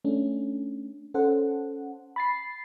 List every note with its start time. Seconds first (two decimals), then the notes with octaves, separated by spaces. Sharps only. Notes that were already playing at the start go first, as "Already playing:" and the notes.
0.05 A3 C#4 D4
1.14 C#4 A4 C5 F#5
2.16 B5 A6 C7